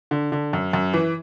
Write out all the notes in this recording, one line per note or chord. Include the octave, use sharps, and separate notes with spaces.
D3
D3
F#2
F#2
E3